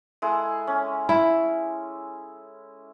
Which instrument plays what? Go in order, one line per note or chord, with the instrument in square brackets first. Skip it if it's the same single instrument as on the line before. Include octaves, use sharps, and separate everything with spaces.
[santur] G#3 E4 A4
C#4
[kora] E4